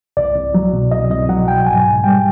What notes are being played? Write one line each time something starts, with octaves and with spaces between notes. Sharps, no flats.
C2 D5
C2
F#3
B2
C2 D#5
C2 D#5
F#3 F#5
B2 G5
G#2 G#5
G#2
G3 G5